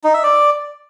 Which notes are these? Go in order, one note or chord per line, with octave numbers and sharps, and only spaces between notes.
D#4
E5
D5